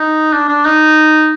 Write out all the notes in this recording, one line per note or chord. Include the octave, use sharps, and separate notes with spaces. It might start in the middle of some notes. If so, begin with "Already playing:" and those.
Already playing: D#4
D4
D4
D#4